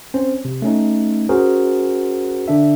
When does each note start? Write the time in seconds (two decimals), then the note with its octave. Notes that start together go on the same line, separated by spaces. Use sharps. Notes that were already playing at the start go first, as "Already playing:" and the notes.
0.14 C4 C#4 C5
0.45 C3
0.62 A3 C#4 D#4
1.29 C#4 F#4 G#4 A#4 C5
2.48 D3 D4 E5